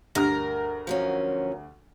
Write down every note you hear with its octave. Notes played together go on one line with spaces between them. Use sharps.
D2 G2 D4 G4 A#4 F6
F3 F#3 C#4